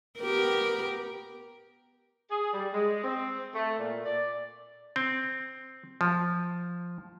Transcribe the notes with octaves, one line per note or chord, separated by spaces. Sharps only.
B3 G4 A#4
G#4
G3
G#3
C4
A3
A#2
D5
C4
F3